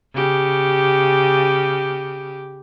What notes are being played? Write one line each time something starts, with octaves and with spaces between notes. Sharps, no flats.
C#3 G4